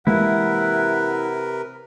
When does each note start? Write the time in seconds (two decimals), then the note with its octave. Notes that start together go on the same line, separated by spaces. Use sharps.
0.07 C3 E3 G#3 A#3 E4 A#4 B4 F#5